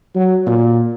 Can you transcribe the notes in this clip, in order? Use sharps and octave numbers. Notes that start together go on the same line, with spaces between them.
F#3
A#2